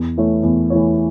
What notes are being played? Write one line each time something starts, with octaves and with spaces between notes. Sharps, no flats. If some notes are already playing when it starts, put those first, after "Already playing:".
Already playing: E2
E3 A3 E4 C#5
E2
E3 A3 E4 C#5